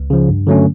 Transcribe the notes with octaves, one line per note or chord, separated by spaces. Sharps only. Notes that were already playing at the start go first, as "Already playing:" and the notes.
Already playing: C#2
C#3 F3
G2
D3 F#3 A3 C#4